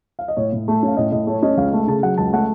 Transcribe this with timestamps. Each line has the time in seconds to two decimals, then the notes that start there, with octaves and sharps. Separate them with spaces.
0.19 F5
0.28 D#5
0.37 A2 C#5
0.52 A2
0.68 A3
0.83 C#4 F5
0.97 A2 D#5
1.12 A2 D#5
1.27 A3 C#5
1.43 C#4 D#5
1.57 C#2 F5
1.73 A3
1.87 C#3 A5
2.03 F#3 F#5
2.18 C#2 A5
2.33 A3 F#5